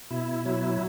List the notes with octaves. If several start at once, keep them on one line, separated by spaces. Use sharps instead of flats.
B2 E4
F#3 E4